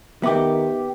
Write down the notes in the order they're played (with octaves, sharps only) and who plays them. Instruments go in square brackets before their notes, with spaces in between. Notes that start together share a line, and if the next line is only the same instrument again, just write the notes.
[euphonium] D#3 [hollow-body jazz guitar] B3 G4 [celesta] E5 D6